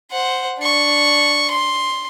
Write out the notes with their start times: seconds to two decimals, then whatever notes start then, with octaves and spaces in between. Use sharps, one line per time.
0.12 C5 F#5
0.59 D4 C#6
1.50 C6